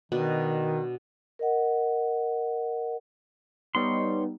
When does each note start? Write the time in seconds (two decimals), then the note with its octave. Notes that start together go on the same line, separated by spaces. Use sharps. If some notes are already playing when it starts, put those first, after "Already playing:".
0.12 B2 D#3 D4 B4
1.39 A#4 D#5 F#5
3.75 G3 B3 D#4 C#5 C6